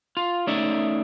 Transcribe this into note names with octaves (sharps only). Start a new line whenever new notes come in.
F4
A3 C#4 D#4 D5 E5